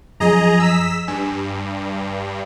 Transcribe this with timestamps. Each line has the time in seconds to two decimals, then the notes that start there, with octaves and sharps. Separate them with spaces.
0.20 F#2 F3 G#4 D#5 A#5
0.60 E6 B6
1.08 G2 G#5